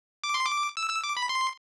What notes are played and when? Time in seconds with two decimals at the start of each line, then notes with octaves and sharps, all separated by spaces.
0.24 D6
0.34 C6
0.46 D6
0.77 E6
0.90 E6
1.04 D6
1.17 B5
1.29 C6